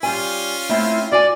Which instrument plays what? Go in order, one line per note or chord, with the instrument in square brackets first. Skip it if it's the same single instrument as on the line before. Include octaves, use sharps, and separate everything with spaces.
[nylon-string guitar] G3 G4 G#5 [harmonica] C#4 F4
[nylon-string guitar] A3 C4 E4
[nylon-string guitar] F#4 G#5 [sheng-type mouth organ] D5